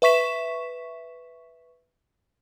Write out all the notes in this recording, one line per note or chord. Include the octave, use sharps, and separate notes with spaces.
B4 E5 C#6 B6 E7